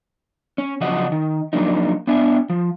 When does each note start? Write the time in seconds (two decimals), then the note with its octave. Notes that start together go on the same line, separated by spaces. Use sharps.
0.58 C#4
0.81 C#3 F3 F#3 C#4 D#5 F#5
1.12 D#3
1.53 F3 F#3 A#3 D4 D#4
2.07 B3 D4 E5 G#5
2.50 F3